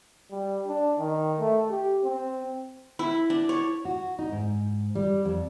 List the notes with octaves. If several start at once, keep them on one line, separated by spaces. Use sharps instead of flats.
G3
D4
D#3
A3
G4
C4
E4
D4
C#5
F#4
D#4
G#2
G3
F2